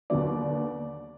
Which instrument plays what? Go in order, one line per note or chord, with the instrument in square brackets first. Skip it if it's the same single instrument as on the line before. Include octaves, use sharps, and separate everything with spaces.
[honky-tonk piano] D#2 D3 F#3 B3 D5